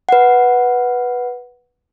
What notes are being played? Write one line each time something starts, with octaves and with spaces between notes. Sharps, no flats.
B4 F#5